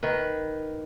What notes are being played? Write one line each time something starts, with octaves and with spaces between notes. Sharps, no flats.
D#3 B4